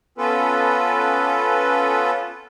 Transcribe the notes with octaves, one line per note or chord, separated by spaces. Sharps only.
B3 C#4 F4 A4 B4